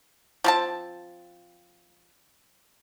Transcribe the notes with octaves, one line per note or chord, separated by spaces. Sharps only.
F3 C4 A5